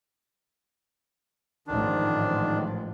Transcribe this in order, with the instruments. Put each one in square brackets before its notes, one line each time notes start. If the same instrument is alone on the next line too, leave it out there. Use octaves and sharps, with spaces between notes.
[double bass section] A1 G#2 F3 [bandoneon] D#3 D4